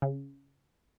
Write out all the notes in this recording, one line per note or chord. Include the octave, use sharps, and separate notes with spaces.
C#3